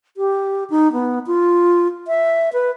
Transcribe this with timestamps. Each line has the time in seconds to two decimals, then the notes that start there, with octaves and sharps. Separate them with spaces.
0.17 G4
0.70 D#4
0.93 B3
1.27 F4
2.08 E5
2.53 B4